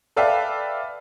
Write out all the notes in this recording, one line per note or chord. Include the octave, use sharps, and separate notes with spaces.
A4 B4 D5 E5 F5 G5